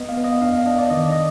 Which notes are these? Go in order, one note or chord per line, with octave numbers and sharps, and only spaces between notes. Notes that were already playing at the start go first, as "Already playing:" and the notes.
Already playing: B3 D#5
F5
B3
D#5
D4 F5
F5
D4 D#5
D5
D#3 D#5
D5
D#5